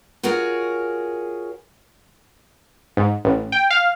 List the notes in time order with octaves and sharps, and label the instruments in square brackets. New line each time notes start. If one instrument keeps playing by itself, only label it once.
[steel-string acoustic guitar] F4 F#4 G#4 A#4 C#5
[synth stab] G#2
A1
G5
F5